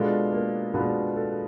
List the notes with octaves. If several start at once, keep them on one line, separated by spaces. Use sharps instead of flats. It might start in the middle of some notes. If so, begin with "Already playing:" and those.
Already playing: B2 G#3 B3 D4 F4 A4
A#3 A#4
B2 G#3 B3 D4 F4 B4
A4